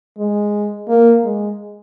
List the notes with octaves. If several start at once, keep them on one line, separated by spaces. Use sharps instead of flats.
G#3
A#3
G#3